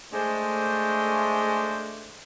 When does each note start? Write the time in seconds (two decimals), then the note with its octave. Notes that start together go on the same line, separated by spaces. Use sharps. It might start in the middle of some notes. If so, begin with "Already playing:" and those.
0.13 G#3 A3 D4 C5